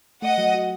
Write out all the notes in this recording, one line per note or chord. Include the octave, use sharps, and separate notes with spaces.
A3 D#5 F#5
F#3
F#4